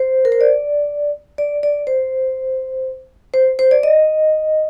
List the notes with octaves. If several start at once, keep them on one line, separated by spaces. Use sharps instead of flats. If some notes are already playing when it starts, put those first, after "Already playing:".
Already playing: C5
A#4
C5
D5
D5
D5
C5
C5
C5
D5
D#5